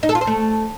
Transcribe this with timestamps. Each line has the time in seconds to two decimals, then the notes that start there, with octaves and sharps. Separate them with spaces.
0.03 D#4
0.09 A4
0.15 F4
0.21 C5
0.27 A3